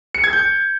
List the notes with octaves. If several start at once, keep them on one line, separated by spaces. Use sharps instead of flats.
C#7
G#6
G6